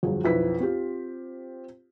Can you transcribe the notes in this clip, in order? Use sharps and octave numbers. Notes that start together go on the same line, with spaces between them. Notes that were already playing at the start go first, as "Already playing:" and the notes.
G1 F2 F#3 G#4
B1 F2 E4 B4 B6
C4 F4 G4